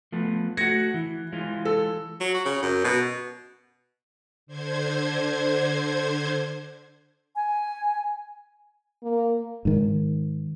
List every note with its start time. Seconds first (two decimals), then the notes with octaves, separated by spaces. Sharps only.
0.12 F3 A3 B3
0.57 A3 F#4 G#6 A#6 C#7
0.94 E3
1.32 E3 G#3 F4
1.65 A4
2.21 F#3
2.34 F#4
2.46 C#3
2.63 F#2
2.84 B2
4.47 D3 C5 G#6
7.36 G#5
9.03 A#3
9.65 G#2 D#3